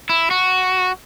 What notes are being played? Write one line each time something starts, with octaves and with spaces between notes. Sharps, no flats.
E4
F#4